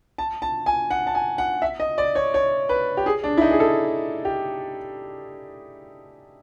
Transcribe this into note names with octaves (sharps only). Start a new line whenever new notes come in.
A5
A5
G#5
F#5
A5
G#5
F#5
E5
D#5
D5
C#5
C#5
B4
G4
G#4
D4
E4
D#4
G#4
A4
G4